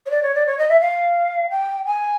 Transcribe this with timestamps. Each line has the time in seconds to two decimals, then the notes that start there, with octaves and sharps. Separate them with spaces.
0.06 C#5
0.11 D5
0.23 C#5
0.35 D5
0.46 C#5
0.58 D#5
0.69 E5
0.81 F5
1.50 G5
1.85 G#5